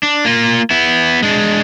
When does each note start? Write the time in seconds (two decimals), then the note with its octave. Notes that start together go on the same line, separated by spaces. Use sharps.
0.03 D4
0.25 A#3 F4
0.70 B3 E4
1.23 G#3 D4